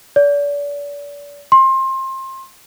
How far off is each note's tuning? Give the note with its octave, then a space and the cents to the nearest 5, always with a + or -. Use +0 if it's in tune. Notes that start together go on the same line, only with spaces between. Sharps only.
D5 -35
C6 +25